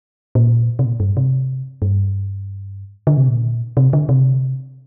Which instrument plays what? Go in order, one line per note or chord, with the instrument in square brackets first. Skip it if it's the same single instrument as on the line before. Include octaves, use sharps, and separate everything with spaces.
[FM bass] A#2
C3
A#2
G2
C3
G2
D3
C3
A#2
C3
D3
C3